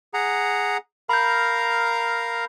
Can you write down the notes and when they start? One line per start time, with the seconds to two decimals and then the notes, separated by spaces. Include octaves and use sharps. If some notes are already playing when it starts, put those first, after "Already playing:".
0.14 G#4 F#5 A#5
1.09 A#4 F5 A#5 B5 G6